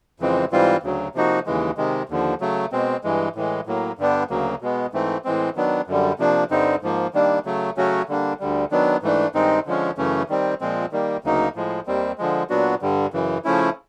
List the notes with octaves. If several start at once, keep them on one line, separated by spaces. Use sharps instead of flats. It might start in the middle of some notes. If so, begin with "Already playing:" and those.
F2 C#3 E3 G#3 C4
G#2 E3 G3 C4 F4
D2 C#3 F#3
C3 F3 A#3 D#4 F#4
D#2 C#3 E3 G#3
C3 D#3 G#3
D#2 D3 F3
C#3 F#3 A3
B2 G#3 C4
G2 E3 G#3
A2 E3 G#3
A2 F#3 A#3
G2 D3 G3 B3 D4
D2 C#3 F#3 A#3
B2 G#3 B3
G#2 E3 A3 C4
A2 E3 G#3 C4
D#3 F#3 B3 D4
F#2 D3 G3
C3 F3 A#3 D4
G2 D3 G3 C4 D#4
G#2 F3 A#3
D#3 G3 A#3 D4
C#3 F#3 A3
C#3 F#3 A3 C#4 F#4
D3 G3 A#3 D4
D2 D3 G3
D#3 F#3 B3 D4
G#2 E3 A3 D4
G2 D#3 G#3 C4 D#4
D3 F3 G#3 C#4
F#2 C#3 E3 A3 C#4
D#3 G3 C4
A#2 F3 G#3 C4
D#3 G3 A#3
D2 C#3 F#3 A#3 D#4
A2 F3 G#3
D#2 D#3 G3 C4
D3 F3 G#3
A#2 F#3 B3 D4 F#4
G2 D3 G3
F#2 C#3 E3
C#3 F3 A3 C#4 E4